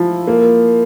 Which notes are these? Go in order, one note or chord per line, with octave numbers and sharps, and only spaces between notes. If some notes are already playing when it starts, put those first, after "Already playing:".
Already playing: F3 E4
A#3